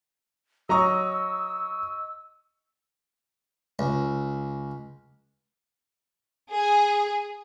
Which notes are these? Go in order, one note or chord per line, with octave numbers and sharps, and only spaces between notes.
F#3 D#5 A#5 C#6 D#6 E6
C#2
G#4